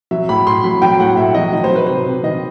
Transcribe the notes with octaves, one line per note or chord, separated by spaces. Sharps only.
F#3 E5
A2 B5
A2 C6
F#3 B5
F#3 G5
A2 F#5
A2 E5
F#3 D#5
D#3 D#5
C5
F#3
B4
C3 C5
C3
D#3 D#5